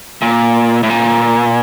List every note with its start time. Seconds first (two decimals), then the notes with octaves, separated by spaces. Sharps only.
0.22 A#2
0.83 A2
0.90 A#2